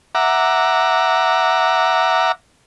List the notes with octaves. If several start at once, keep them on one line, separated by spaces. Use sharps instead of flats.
E5 F#5 A#5 D6